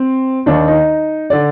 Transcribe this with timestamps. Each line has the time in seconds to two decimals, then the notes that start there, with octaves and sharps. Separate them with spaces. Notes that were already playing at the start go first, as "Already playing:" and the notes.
Already playing: C4
0.46 D#2 D#3 D4
0.68 D#4
1.30 D3 D5